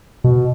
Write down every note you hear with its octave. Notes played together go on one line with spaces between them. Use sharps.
B2